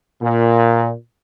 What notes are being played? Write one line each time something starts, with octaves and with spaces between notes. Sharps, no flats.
A#2